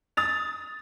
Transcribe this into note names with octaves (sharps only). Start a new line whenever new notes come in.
D#6 A6 F7